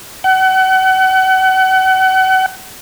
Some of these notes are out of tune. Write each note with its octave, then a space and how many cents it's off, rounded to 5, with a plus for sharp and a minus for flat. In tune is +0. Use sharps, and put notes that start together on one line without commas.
F#5 +35